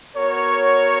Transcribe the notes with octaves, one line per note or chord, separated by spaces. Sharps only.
B3 F#4 A#4 C#5